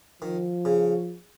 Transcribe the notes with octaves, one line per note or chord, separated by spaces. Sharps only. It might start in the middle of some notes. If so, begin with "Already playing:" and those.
D#3 F3
C#3